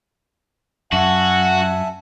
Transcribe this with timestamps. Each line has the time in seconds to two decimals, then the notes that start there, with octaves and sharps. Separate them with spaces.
0.93 F#2 F#4 E5 F#5 G#5 A5